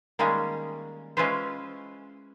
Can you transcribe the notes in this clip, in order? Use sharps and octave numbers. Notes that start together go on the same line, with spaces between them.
D#3 G3 G#3 A#3 C#4
G#3 C#4 E4 F4 B4 C5